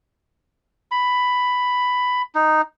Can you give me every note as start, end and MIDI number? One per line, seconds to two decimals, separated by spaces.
0.91 2.22 83
2.35 2.61 63